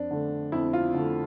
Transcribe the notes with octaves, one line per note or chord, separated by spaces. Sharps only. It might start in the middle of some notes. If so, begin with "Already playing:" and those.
Already playing: F2 D4
D3 A3
F2 E4
F4
D3 A3